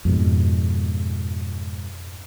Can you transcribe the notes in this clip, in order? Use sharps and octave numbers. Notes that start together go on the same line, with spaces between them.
F2 G#2 B2